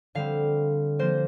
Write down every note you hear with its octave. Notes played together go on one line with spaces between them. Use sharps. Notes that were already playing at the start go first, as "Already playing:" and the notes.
D3 G3 C4 F5
F3 A#3 C5